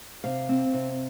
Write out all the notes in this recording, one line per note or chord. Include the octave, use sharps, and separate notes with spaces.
C3 F5
C4
C3